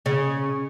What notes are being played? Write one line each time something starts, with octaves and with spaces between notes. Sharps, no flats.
C#3